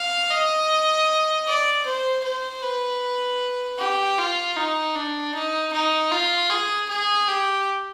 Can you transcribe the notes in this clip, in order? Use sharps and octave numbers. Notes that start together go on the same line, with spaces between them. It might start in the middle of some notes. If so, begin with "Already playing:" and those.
Already playing: F5
D#5
D5
C5
C5
B4
G4
F4
D#4
D4
D#4
D#4
F4
G#4
G#4
G4